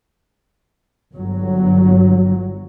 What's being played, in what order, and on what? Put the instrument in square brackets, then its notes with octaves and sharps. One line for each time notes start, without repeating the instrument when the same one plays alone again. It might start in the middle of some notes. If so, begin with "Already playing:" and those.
[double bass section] G1 F#3